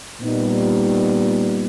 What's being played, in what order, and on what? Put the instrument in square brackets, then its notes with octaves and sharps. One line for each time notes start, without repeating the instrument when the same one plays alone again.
[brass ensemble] A#2 G3 B3 D#4